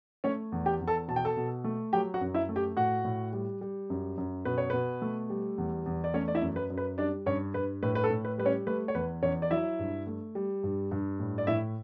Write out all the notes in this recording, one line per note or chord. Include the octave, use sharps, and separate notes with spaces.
A3 C#4 C#5
E2
G4 G5
E2
A4 A5
B2 A5
G5
A4 A5
B2
A3
F#3 G4 G5
F#4 F#5
F#2
E4 E5
A3
G4 G5
A2 F#4 F#5
A2
G3
G3
F#2
F#2
B2 B4
C#5
B2 B4
A3
G3
E2
E2
D5
A3 C#4 C#5
D5
E4 E5
F#2
B4
F#2
B4
G3 D4 D5
G2 C#4 C#5
G2 B4
A2 B4
B4
A4
A2
B4
G3 B4
C#4 C#5
A3 B4
C#5
E2 B4
E2 C#4 C#5
D5
F#3 E4 E5
G2
A3
G3
G2
G2
A2
D5
A2 E4 E5